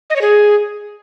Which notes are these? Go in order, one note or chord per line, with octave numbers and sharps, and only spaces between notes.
D#5
C#5
G#4